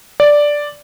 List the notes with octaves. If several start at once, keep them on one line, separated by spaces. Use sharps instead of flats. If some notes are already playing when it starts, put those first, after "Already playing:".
D5